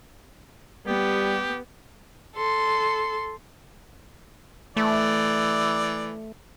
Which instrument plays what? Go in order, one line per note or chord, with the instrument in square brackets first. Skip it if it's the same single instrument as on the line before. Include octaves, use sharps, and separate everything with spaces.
[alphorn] G3 [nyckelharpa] B3 [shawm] G4
[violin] A4 C6
[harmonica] E3 D5 [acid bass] A3